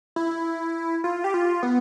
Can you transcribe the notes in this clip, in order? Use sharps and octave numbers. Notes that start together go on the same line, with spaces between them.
E4
F4
G4
F4
B3